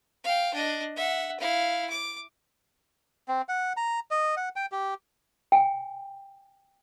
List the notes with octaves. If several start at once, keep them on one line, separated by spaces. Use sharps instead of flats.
F5 G5
D4 D#5
E5 F#5
E4 F5
D6
C4
F#5
A#5
D#5
F#5
G5
G4
G5 G#5